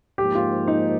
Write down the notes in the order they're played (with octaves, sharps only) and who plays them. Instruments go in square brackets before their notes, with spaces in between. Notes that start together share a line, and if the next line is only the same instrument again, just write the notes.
[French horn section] G#2 F3 A#3 [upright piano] G4
[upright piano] F4
D#4